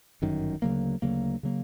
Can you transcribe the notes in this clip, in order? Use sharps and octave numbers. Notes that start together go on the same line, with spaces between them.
G1 F#2 D#3
D2 C#3 F#3 A#3
D2 C#3 F#3 A#3
C#3 F#3 A#3